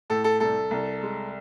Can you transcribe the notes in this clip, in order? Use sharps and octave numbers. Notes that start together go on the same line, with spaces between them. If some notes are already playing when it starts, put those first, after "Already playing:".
A2 A4
A4
C2 A4
C2
G#3